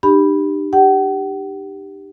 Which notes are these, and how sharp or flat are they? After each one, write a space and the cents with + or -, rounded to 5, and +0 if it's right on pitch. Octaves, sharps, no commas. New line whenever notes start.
D#4 -45 G4 +0 B5 +0
G4 +0 F#5 +40